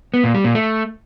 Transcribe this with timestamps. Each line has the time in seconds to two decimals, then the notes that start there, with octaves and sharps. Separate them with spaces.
0.14 B3
0.24 A#2
0.34 G3
0.44 A#2
0.55 A3